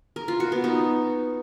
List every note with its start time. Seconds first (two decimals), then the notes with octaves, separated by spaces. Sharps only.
0.16 A#4
0.28 F4
0.40 F#4
0.52 B3
0.64 D#4